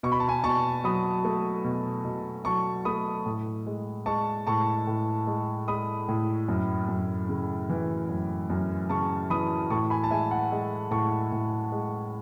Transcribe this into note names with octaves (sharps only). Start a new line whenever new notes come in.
B2 C#6
B5
A5
G#5 B5
B2 A5 C#6
F#3 B5 D#6
A3
B2
B2
F#3 A5 C#6
A3 B5 D#6
A2
G#3
G#3 A5 C#6
A2 A5 C#6
A2
G#3
G#3 B5 D#6
A2
F#2
F#2
C#3
E3
F#2
F#2
C#3 A5 C#6
E3 B5 D#6
A2 A5 C#6
G#5 B5
A5
G#3 E5 G#5
F#5 A5
G#3
A2 A5 C#6
A2
G#3